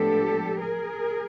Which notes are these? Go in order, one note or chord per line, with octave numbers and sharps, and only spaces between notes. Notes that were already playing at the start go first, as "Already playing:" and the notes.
Already playing: A2 F3 G#3 B3 D4 G4 A4
G#4 A#4